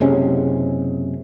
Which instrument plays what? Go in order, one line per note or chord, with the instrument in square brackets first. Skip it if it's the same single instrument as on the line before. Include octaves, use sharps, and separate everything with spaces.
[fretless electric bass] F#1 C3 G#3 C#4